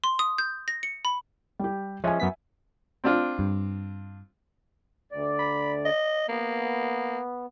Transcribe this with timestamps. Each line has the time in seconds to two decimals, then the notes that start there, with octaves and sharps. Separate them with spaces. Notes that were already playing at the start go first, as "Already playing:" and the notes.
0.04 C6
0.19 D#6
0.38 G6
0.68 A#6
0.83 C#7
1.05 B5
1.60 G3 G4
2.04 F3 G#3 C#4 E5 G#5
2.20 F#2 B3 B6
3.04 C4 D4 F4
3.39 G2
5.12 D2 D5
5.39 B5
5.85 D#5
6.29 A#3 B3